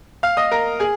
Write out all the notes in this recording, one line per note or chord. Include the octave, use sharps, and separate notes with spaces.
F5 F6
D#5 D#6
A#4 A#5
G#4 G#5